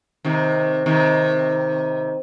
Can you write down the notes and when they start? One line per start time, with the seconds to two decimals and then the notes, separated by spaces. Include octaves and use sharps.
0.25 C3 D#3
0.86 C3 D#3